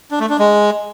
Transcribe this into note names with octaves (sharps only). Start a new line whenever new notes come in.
D4
A3
D4
G#3